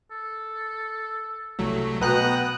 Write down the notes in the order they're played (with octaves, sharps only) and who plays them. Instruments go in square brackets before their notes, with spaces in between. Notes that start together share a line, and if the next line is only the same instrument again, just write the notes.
[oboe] A4
[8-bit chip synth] C2 F#3 A3
[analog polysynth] B2 F#6 [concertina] B3 G5 A#5 [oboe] F#5 [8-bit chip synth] D#6